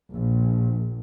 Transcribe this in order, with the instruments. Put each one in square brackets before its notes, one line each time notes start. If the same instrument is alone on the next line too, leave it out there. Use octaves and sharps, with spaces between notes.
[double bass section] A#1